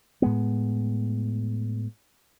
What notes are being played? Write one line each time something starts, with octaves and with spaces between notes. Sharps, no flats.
A2 G#3 B3